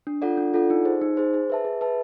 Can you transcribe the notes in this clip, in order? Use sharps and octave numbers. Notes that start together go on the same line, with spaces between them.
D4
F4 A4 D5 F#5
D4
F4 A4 D5 F#5
D#4
G#4 C5
D#4
G#4 C5
G#4
B4 E5 A5
G#4
B4 E5 A5